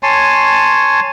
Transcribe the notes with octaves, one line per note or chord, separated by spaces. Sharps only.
C#5 G#5 A5 C6